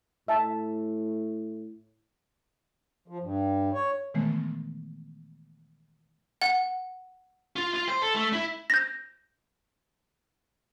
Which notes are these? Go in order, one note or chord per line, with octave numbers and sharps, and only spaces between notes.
A2 E5 A5
F3
G2
C#5
A#2 D#3 E3 G#3 A3 B3
F#5
F4
F4
C5
A4
A3
E4
G6 A#6